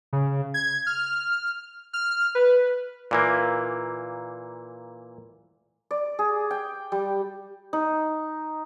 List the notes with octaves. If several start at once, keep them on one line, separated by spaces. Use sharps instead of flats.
C#3
G#6
F6
F6
B4
A#2 E3 A#3
D5
G#4
G5
G3
D#4